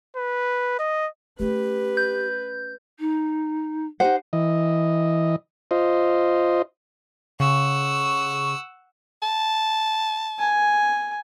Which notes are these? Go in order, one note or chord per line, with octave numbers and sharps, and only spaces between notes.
B4
D#5
A3 C#4 G4 B4
G6
D#4
D#4 G4 C5 F#5
E3 D#5
F4 C5 D#5
C#3 F#5 C#6 E6
A5
G#5